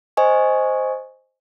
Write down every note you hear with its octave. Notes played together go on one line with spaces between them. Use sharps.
C5 D#5 G#5 C#6